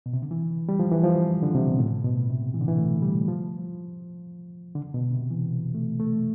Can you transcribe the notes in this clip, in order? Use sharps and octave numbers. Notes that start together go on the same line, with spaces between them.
B2
C3
D3
E3
G3
F3
E3
F3
D3
C3
B2
A2
B2
C3
E3
D3
E3
A3
G3
F3
D3
B2
C3
E3
A3
A3